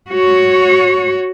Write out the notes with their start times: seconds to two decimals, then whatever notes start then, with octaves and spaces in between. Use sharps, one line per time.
0.11 F#4 C#5